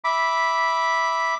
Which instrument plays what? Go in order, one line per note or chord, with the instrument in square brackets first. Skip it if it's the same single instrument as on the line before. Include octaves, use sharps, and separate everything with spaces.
[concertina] E5 B5 D6